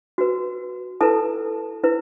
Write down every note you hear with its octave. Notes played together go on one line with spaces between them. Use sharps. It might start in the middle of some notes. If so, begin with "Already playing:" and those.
F#4 B4
E4 A4 B4 A5
E4 B4